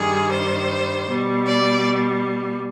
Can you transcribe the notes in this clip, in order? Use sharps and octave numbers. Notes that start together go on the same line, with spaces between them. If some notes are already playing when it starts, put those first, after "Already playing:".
Already playing: G2 D#3 G3 G#4
C5
B2 G3
D5